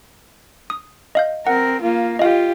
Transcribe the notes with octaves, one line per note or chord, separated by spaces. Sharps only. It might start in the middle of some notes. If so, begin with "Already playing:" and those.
D#6
D#5 F5 G6
C4 A#4 F#5
A#3 F4
F4 G4 D#5 F5